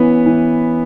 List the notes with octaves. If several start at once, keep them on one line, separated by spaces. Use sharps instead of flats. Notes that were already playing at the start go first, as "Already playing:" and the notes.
Already playing: E3 B3 C#4 B4
E3